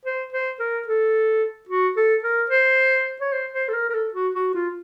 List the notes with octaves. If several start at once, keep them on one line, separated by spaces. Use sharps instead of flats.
C5
C5
A#4
A4
F#4
A4
A#4
C5
C#5
C5
C5
A4
A#4
A#4
A4
F#4
F#4
F4